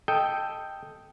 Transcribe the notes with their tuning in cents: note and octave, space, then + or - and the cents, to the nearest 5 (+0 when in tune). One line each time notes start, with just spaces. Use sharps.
A4 +0 D#5 +5 G5 +0